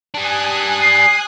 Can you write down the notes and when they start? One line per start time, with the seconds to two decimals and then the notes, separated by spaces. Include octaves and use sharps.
0.14 G3 D4 G#5 D#6 F#6
0.82 C7